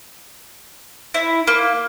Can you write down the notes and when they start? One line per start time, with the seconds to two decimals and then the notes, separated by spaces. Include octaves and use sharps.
1.14 E4
1.47 A#3